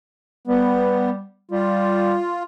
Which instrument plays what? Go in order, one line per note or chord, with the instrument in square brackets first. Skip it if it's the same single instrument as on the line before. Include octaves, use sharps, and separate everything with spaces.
[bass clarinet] G3 [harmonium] B3
[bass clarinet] G3 [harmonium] F4